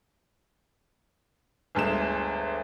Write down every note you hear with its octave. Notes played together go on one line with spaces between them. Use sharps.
G1 D2 G#3 E7